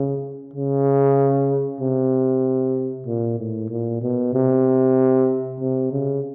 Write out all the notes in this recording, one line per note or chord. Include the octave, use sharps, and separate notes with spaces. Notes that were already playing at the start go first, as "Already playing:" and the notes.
Already playing: C#3
C#3
C3
A#2
A2
A#2
B2
C3
C3
C#3